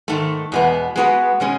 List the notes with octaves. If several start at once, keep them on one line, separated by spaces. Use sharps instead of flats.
G#2 D#3 A3
E2 B2 G#3 B3
G#3 B3 F#4 B4
B2 G#3 C#4